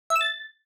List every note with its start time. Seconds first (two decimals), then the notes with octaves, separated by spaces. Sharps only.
0.10 E5
0.16 E6
0.21 A6